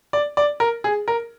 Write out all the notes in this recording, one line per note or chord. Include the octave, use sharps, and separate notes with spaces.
D5
D5
A#4
G#4
A#4